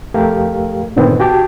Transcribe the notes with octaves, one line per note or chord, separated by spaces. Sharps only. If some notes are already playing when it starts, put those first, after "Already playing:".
F2 A3 G4 A#4 F5
G2 A#2 D3 D#3 B3 C4
F#4 G4 G5 A5 D6